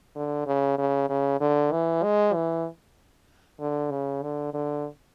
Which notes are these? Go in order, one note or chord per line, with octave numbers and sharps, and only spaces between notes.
D3
C#3
C#3
C#3
D3
E3
G#3
E3
D3
C#3
D3
D3